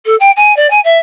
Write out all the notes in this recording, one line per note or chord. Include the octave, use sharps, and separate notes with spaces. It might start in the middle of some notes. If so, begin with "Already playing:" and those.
A4
G5
G#5
D5
G#5
E5